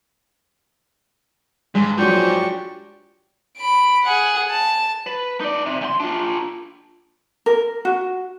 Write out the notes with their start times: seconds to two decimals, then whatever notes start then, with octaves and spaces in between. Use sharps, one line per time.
1.75 G2 G#3
1.98 F3 F#3 D4 G4 G#4 C5 C#6 G6
3.57 B5 D7
4.04 G#4 F#5
4.50 A5
5.07 B4
5.40 D#4 D5
5.66 C3
5.81 D2 C6
6.00 D4 F4
7.46 A#4
7.85 F#4